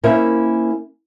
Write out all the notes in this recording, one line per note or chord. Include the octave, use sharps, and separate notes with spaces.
A#3 C#4 E4 A#4 C5 E5